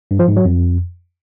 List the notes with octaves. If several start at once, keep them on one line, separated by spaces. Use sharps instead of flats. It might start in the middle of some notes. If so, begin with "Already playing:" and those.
G2
F3
G#2
F#3
F2